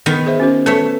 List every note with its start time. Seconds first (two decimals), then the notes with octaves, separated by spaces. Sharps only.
0.06 D#3 B3
0.26 G#4 C5 E5
0.40 C#4 F#4 C5
0.66 A3 B4 C#5 E5